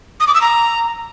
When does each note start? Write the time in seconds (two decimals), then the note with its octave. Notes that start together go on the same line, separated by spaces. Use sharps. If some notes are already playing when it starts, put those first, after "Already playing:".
0.20 D#6
0.27 D6
0.34 E6
0.41 A#5